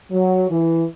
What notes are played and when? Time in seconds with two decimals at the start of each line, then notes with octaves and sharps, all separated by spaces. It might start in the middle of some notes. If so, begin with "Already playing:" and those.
0.11 F#3
0.50 E3